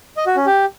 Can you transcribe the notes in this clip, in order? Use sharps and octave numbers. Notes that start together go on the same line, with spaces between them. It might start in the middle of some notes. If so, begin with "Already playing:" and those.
D#5
F#4
C#4
G4